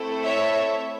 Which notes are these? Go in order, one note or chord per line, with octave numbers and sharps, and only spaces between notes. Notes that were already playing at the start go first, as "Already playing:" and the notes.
Already playing: A3 C4 E4 A4
C#5 E5